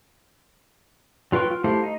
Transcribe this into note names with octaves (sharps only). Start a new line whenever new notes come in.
F#3 F4 B4 G5 C#6
F4
A3 E4 G4 C5 F5
D#4